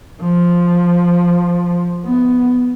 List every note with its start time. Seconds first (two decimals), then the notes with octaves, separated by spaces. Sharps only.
0.22 F3
2.06 B3